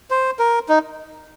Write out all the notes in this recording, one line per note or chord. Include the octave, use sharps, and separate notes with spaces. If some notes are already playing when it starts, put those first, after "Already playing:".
C5
A#4
D#4